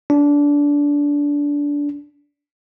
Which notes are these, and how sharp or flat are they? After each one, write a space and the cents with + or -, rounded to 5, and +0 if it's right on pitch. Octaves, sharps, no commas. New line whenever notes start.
D4 -20